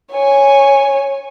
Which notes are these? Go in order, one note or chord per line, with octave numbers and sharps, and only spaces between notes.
C#5 G#5